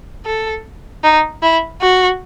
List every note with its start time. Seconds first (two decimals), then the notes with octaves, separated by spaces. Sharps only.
0.26 A4
1.04 D#4
1.42 E4
1.81 F#4